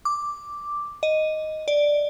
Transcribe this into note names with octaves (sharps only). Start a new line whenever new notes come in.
D6
D#5
D5